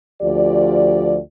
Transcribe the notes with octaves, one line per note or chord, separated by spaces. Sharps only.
D2 F3 F4 G4 D5